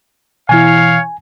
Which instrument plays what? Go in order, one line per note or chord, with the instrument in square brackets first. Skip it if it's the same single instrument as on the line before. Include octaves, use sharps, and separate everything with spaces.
[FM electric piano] B2 E3 E4 [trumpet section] C#5 F5 [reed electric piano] G#5